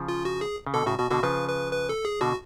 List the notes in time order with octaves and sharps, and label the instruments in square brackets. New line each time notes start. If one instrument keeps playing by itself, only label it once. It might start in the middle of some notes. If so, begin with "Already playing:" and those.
Already playing: [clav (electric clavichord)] C#3 F3
[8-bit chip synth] F4
F#4
G#4
[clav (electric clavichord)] C#3
[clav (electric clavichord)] B2 D3 [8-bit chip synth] A4
[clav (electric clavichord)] A2 C#3 [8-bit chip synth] F#4
[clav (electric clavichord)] B2 [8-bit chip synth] F#4
[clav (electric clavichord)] B2 D3 [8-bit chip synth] F#4
[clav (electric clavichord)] C#3 F3 [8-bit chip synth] B4
[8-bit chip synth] B4
B4
A4
G#4
[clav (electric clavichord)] B2 D3 [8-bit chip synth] F#4